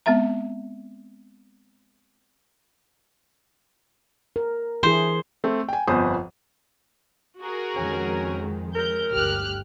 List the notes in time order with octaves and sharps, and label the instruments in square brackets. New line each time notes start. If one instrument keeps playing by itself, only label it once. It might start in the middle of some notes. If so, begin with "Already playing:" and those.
[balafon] G#3 B3 C4 E5 A#5
[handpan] A#4
[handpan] E3 E4 G#4 [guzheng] C5
[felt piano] A3 C4
G5 G#5
G1 F2 B3 C5 G#5 D#6
[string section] F#4 G#4 A#4
[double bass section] F2 D#3 G#3 [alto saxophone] C#4
[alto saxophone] A#4 [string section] G6
[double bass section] G1 D2 [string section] G4 F6 F#6